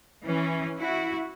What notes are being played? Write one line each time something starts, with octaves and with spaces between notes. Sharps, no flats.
E3 C#4
E4 F#4